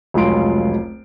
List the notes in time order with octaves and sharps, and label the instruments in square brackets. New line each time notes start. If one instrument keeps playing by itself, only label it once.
[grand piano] F1 C#2 F#3 F4 C6 D7